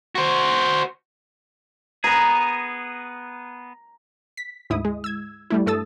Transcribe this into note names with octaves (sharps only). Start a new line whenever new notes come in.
F#4 C5
B3 G#4 A#5
B6
D2 G#2 E4 D#6
G#3
E6 G#6
G3 A3 E4
G2 A3 A4 D#6 E6 A6